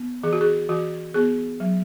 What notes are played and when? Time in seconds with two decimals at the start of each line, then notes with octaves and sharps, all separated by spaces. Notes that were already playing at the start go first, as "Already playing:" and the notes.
Already playing: B3
0.23 E3 G#4
0.33 F#4
0.41 G#4
0.69 E3 F#4
1.14 B3 G#4
1.60 F#3